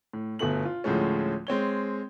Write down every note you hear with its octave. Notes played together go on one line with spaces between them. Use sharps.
A2
G1 B2 A3 F#7
F4
D2 A2 F3 G#3 C#4
G#3 C4 C#5 G7